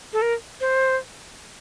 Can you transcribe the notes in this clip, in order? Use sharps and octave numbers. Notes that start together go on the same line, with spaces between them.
A4
A#4
C5